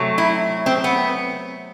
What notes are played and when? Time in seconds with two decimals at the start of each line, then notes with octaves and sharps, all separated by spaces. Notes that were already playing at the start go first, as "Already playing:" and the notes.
Already playing: C3 F#3 A3
0.18 E4
0.66 C4
0.84 B3